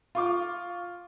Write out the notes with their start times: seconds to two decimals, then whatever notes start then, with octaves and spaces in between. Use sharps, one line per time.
0.15 F4 C#6 D6